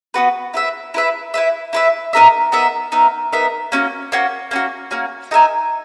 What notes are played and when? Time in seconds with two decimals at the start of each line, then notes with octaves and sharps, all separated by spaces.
0.14 B3 F#4 B4
0.54 E4 B4 E5
0.94 E4 B4 E5
1.34 E4 B4 E5
1.73 E4 B4 E5
2.13 B3 D#4 A#4 E5
2.52 B3 D#4 A#4 E5
2.92 B3 D#4 A#4 E5
3.33 B3 D#4 A#4 E5
3.72 A#3 C#4 F#4
4.12 A#3 C#4 F#4
4.51 A#3 C#4 F#4
4.91 A#3 C#4 F#4
5.31 D#4 A#4 E5 G#5